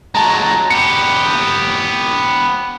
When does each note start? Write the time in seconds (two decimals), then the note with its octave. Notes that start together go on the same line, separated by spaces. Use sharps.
0.15 F#3 G#3 A5 A#5
0.70 B3 G4 C#7